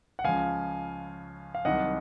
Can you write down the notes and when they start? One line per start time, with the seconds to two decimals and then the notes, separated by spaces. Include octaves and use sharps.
0.19 F#5
0.24 C#2 C#3 F3 F5 G#5
1.55 F5
1.65 C2 C3 D#3 F#3 D#5 F#5